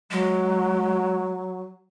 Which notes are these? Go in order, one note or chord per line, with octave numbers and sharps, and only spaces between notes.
F#3 G#3